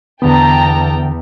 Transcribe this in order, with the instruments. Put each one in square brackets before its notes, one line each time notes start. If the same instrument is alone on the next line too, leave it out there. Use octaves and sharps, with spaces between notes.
[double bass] E2 [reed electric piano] D3 B3 [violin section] G5 A5 A#5